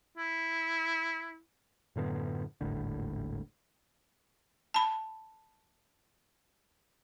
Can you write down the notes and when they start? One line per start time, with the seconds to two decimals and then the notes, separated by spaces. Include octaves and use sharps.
0.17 E4
1.96 F#2 A2 D3 B3
2.61 D#1 G#1 A2 D3
4.74 A5 B5